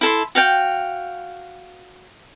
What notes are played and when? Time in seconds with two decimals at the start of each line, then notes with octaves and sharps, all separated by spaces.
0.01 E4 A4 C6
0.35 F#4 F5 G5